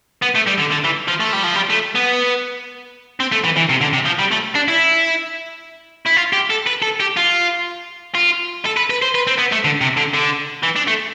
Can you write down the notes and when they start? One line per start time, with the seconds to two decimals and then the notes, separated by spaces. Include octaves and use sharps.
0.22 B3
0.35 A3
0.47 G3
0.58 D3
0.71 D3
0.84 E3
1.08 F3
1.20 A3
1.33 G3
1.44 F3
1.55 G3
1.70 A3
1.95 B3
3.20 C4
3.32 A3
3.44 E3
3.57 E3
3.69 C3
3.81 D3
3.93 C3
4.05 F3
4.19 G3
4.31 A3
4.55 D4
4.68 E4
6.06 E4
6.17 F4
6.33 G4
6.50 A4
6.67 B4
6.82 A4
7.00 G4
7.17 F4
8.15 F4
8.65 A4
8.77 B4
8.90 B4
9.02 C5
9.15 B4
9.27 C4
9.39 B3
9.52 A3
9.65 D3
9.81 C3
9.97 D3
10.14 D3
10.63 E3
10.76 D4
10.87 A3